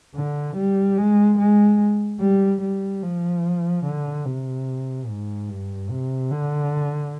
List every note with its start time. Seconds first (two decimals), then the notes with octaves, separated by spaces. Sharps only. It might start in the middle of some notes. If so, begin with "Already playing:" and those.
0.15 D3
0.57 G3
0.98 G#3
1.39 G#3
2.20 G3
2.62 G3
3.03 F3
3.85 D3
4.25 C3
5.08 G#2
5.49 G2
5.90 C3
6.31 D3